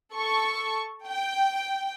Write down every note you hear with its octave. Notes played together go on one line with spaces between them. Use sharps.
A4 C#6
G5